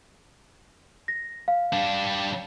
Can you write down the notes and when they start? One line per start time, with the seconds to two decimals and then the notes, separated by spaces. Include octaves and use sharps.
1.08 A#6
1.48 F5
1.73 G3 D4